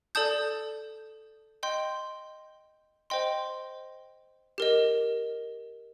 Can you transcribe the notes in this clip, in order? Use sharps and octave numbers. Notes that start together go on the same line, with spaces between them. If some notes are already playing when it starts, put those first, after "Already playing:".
A4 D5 A5 D#6 G6
D#5 G5 C6 G6
C5 D#5 G5 C6
G4 A#4 D#5